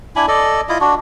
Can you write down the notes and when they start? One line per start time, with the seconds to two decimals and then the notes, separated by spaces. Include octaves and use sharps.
0.16 D4 E4 G#5 B5
0.28 A4 D5 D#5
0.69 E4 F4 D#5
0.81 D4 F#4